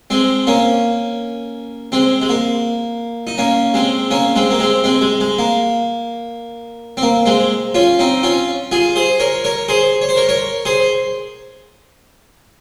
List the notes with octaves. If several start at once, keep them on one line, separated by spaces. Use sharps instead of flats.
G#3 C4
A#3 C#4
G#3 C4
G#3
A#3
D#4
A#3 C#4
G#3 C4
A#3 C#4
G#3 C4
A#3
G#3 C4
G#3 C4
G#3
G#3
A#3
C4
A#3
G#3 C4
C#4 F4
C4 D#4
C#4 F4
F4 G#4
G#4 C5
A#4 C#5
A#4 C#5
G#4 C5
C#5
C5
A#4 C#5
A#4 C#5
G#4 C5